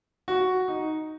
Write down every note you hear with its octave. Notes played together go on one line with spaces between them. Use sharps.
F#4
D#4